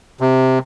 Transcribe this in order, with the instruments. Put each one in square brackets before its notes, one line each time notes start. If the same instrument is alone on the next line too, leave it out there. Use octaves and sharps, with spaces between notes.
[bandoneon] C3